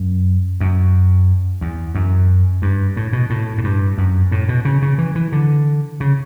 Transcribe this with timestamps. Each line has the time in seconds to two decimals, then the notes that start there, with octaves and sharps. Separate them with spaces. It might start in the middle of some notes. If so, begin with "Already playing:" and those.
Already playing: F#2
0.60 F#2
1.61 E2
1.95 F#2
2.62 G2
2.97 A2
3.13 B2
3.30 A2
3.58 A2
3.64 G2
3.98 F#2
4.32 A2
4.49 B2
4.65 C#3
4.82 C#3
4.98 E3
5.15 E3
5.32 D3
6.00 C#3